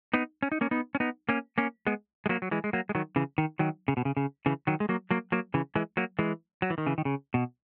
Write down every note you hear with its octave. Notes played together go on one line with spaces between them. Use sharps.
B3 D#4
C#4
D#4
A#3 C#4
B3 D#4
C#4
B3 D#4
A#3 C#4
A#3 C#4
G#3 B3
G#3
F#3 A#3
F#3
E3 G#3
G#3
F#3 A#3
G#3
D#3 F#3
C#3 E3
D#3
D#3 F#3
C#3
B2
C#3
C#3
C#3 E3
D#3 F#3
G#3
F#3 A#3
F#3 A#3
F#3 A#3
C#3 E3
E3 G#3
F#3 A#3
E3 G#3
F#3
E3
D#3
C#3 E3
D#3
C#3
B2